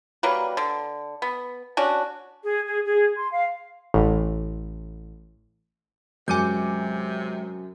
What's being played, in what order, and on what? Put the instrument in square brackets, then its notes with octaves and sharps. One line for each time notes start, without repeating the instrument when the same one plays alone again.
[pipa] F#3 G3 A#3 B4
D3
B3
C#4 D4 F#4
[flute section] G#4
G#4
G#4
C6
F5
[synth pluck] A1
[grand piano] F#2 D#7 [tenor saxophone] C3 [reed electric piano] G#3 [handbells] G#5 D6 G6